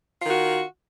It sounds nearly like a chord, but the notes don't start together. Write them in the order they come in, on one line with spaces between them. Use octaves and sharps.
F4 D#3 F#4